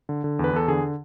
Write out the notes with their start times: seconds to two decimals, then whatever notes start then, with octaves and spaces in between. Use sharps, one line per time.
0.09 D3
0.24 D3
0.39 E2 B4
0.53 E2 A4
0.68 D3 G#4